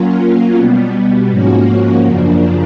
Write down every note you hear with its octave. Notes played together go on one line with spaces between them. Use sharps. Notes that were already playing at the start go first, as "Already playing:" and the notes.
Already playing: F#3 A#3 C#4 F4
B2 G3 B3
G#2 F3 A#3 C#4 F#4
F#2 C#3 F3 A#3 D4